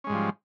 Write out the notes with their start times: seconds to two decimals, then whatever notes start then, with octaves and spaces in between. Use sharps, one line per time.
0.04 C#4
0.07 G#3
0.09 G#2
0.12 G3
0.14 F3